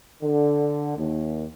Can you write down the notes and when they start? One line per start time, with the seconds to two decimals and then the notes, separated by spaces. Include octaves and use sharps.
0.22 D3
0.97 D#2